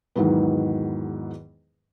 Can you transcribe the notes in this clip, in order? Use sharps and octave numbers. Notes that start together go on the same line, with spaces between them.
E2 G#2 D#3 E3 F#3 B3